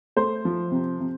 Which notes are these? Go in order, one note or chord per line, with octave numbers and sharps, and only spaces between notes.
A3 C5
F3
C3
C3